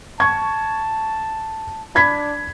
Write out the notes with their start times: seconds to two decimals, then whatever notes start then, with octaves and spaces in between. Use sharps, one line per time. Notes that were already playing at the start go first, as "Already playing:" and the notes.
0.20 A5 C#6 G#6
1.95 D4 B5 G#6 B6